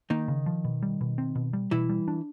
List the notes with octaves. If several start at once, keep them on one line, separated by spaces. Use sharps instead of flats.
D#3 A#3 D#4
C#3
F3
B2
G3
B2
C4
B2
G3
B2 E3 E4
G3
D4